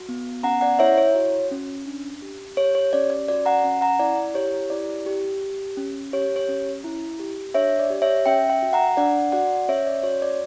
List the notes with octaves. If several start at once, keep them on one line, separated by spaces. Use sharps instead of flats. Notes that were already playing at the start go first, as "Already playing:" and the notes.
Already playing: F#4
B3
C#4 F#5 A#5
D5 F#5
E4 C#5 E5
C#5
F#4
C#4
D4
G4
G4 C#5
C#5
C#4 D5
D5
F#4 D5
F#5 A#5
C#4
F#5 A#5
E4 D5
G4 C#5
E4 D5
G4
G4
C#4
G4 C#5
C#5
C#4
E4
G4
D4 C#5 E5
D5
G4
C#5 E5
C#4 E5 G5
E5 G5
F#4
F#5 A#5
D4 D5 F#5
F#4 D5 F#5
C#4 C#5 E5
D5
F#4 C#5
D5